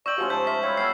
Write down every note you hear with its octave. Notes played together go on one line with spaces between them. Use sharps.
D5 D#5 G5 C#6 E6 F#7
F3 A3 C#4 F#4 G4 G#5 C6
G#2 G#3 A5 G6 B6
E5 F6 B6
G3 E4 F4 C#5
G3 B3 A4 F6 C7